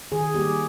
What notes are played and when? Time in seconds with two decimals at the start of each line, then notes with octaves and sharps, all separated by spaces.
0.12 D#3 G#4
0.35 G3 A#3 G4